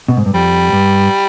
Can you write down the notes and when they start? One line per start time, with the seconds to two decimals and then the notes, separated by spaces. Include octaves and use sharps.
0.09 B2
0.17 G#2
0.26 G2
0.34 F2 G3
0.73 G2